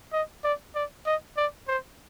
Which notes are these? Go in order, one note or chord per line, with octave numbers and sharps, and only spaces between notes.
D#5
D5
D5
D#5
D5
C5